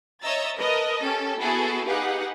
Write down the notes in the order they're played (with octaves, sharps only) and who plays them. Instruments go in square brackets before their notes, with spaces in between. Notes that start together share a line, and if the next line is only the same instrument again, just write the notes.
[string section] C#5 D#5 E5 A#5 E6 A6
A#4 B4 D#5 A5
C#4 G4 A4
B3 E4 F#4 G#4 A4
D#4 G4 G#4 B4 F5 F#5